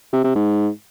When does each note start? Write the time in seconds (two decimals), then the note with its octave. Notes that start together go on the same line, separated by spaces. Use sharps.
0.13 C3
0.24 C3
0.35 G#2